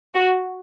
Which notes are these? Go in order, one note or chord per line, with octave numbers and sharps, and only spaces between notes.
F#4